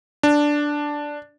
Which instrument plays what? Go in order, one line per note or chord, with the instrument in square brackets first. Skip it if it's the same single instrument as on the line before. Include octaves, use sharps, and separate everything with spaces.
[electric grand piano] D4